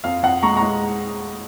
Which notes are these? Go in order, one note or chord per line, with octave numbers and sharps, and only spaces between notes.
F2 F5
F2 F#5
G#3 A#5 C#6
A#5 C#6
G#3